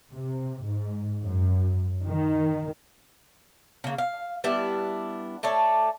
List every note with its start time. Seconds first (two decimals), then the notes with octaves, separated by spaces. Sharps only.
0.13 C3
0.66 G#2
1.23 F#2
2.05 D#3
3.84 C#3 A#3
3.98 F5
4.44 G3 B3 D4 E4
5.43 A3 A4 C#5 D5